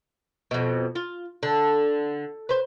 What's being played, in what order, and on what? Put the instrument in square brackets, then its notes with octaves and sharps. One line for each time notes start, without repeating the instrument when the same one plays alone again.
[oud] F2 B2
F4
D3
B4 C5